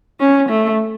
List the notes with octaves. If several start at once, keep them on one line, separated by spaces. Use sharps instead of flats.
C#4
A3